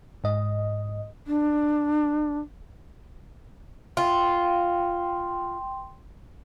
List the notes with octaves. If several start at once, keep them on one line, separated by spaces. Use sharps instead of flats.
G#2 D#5
D4
F4 G5 C6